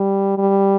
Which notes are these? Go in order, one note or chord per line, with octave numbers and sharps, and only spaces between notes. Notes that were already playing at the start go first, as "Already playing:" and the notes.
Already playing: G3
G3